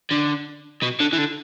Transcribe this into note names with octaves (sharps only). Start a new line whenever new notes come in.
D3
B2
D3
E3
D3